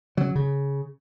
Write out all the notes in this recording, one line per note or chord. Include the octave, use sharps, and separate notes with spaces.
C#3 F#3
C#3